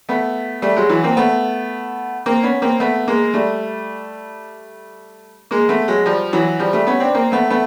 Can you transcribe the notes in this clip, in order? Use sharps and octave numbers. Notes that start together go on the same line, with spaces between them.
A3 B3
G3 A3
F#3 G#3
E3 F#3
A#3 C4
A3 B3
A#3 C4
B3 C#4
A#3 C4
A3 B3
G#3 A#3
G3 A3
G#3 A#3
A3 B3
F#3 G#3
F3 G3
E3 F#3
F3 G3
G3 A3
B3 C#4
C4 D4
A#3 C4
A3 B3
A3 B3